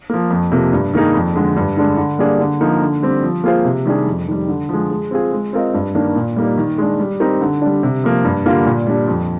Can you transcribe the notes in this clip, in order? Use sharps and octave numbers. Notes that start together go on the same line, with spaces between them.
F3 A#3
F2
C3 F3 A#3
G2
D#3 A#3 D#4 G#4
F2
D3 G#3
G2
D3 G#3 D4
D3
G3 A#3 D4 G#4
D3
F3 A#3 D#4
D3
G3 C4 G4
F3
A#3 F4 G#4 C5
C3
D#3 G3 D4 G#4
F2
D#3 G3
D3
F3 G#3
G#3
C4 F4 G#4
G#3
C4 F4 A#4 D#5
G2
D#3 A#3 D4
A#2
G3 A#3 D#4
D#3
G#3 D4
G3
C4 D#4 G4 A#4
D3
G3 D4
C3
F3 A#3
G2
D3 G3 A#3 F4
A#2
G3 D4
F2